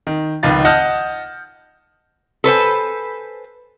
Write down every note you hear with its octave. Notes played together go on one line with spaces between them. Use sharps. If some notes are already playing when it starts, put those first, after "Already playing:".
D#3
F1 C#2 D#3 B4 F5 A6
D#5 F#5 A5 D#6 F6 G6
A4 B4 C5 G#5